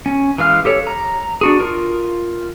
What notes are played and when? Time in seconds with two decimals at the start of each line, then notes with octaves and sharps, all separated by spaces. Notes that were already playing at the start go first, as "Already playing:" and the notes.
0.06 C#4
0.38 E3 G#3 F5 F6
0.65 G4 A4 C#5
0.87 A#5
1.41 D4 F#4 G#4
1.60 F4 A#4